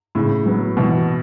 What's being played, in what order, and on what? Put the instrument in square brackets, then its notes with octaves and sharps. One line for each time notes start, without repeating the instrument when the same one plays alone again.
[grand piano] A2 [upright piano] C#3
[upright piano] F#3 B3
[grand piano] B2 [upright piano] E3